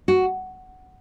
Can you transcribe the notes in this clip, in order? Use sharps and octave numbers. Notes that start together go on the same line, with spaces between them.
F#4